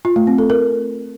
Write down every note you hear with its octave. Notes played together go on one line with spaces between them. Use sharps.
F4
A3
C4
A4
A#4